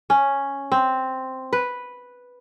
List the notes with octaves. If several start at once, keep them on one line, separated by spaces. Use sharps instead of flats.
C#4
C4
B4